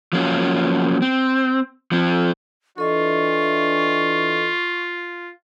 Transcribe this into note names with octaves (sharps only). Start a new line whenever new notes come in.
F3 F#3 A#3 C#4 F4
C4
F3 C4
E3 D4 F4 A4 D#5 C#6